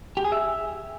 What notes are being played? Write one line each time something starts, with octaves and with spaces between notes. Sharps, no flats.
G4
G#4
E5